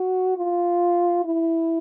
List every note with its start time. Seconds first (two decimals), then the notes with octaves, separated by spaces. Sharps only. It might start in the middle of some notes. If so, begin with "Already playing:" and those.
Already playing: F#4
0.37 F4
1.25 E4